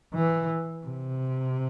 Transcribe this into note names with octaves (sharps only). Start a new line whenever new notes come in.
E3
C3